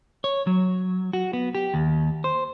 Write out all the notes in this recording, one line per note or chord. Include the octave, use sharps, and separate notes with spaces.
C#5
F#3
F#4
B3
G4
D#2
C5